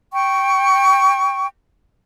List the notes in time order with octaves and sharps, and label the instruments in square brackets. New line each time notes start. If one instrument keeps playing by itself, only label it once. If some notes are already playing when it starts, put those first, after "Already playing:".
[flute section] G5 C#6